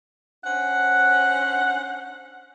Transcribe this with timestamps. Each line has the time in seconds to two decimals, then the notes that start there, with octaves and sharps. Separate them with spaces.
0.44 C#4 D4 C5 F#5